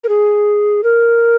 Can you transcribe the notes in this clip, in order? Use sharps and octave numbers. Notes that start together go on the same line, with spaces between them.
A#4
G#4
A#4